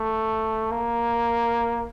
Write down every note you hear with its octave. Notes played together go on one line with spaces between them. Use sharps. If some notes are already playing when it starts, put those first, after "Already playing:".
Already playing: A3
A#3